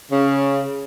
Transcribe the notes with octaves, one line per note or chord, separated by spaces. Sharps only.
C#3